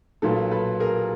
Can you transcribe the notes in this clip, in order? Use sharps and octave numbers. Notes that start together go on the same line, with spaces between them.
B1 A#2 F#3 A4 B4
A4 B4
G#4 A#4